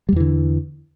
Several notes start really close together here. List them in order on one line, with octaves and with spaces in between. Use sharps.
G3 E2 E3 D3